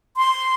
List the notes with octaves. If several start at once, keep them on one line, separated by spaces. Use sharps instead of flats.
C6